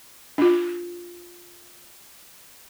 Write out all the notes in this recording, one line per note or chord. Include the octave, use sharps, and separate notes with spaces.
D4 F4